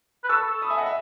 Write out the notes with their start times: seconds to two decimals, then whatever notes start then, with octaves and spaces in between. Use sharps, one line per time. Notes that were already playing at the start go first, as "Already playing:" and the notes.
0.24 B4
0.29 A4 C#6 E6
0.46 A4
0.62 B5 D#6
0.70 E5 G#5
0.78 D#5 F#5
0.86 E5